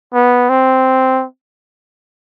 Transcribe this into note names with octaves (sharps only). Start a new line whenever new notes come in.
B3
C4